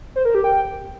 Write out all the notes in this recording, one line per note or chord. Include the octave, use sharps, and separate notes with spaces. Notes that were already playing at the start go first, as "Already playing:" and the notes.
C5
A#4
G4
G5